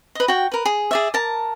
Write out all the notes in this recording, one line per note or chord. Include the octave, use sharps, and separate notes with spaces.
B4 D#5
F#4 G5
A#4 B4
G#4
G#4 D5 E5
A#4 A5